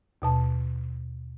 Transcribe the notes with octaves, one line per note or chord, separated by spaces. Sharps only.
D#2 B2 A5